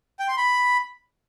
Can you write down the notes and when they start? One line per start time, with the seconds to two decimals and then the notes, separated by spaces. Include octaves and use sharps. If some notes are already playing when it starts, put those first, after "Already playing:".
0.19 G5
0.28 C6
0.37 B5